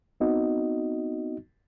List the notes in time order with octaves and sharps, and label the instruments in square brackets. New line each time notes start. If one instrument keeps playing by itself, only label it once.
[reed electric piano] B3 C4 D#4 F#4 D#5